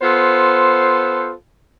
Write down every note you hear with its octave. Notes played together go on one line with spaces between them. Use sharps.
B3 F4 A4 C5